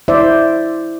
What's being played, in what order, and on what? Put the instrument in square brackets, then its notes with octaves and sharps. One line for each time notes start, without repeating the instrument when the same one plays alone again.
[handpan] E4 C5 D5 E5